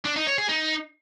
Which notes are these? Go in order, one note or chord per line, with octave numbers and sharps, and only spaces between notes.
D4
D#4
C#5
G#4
D#4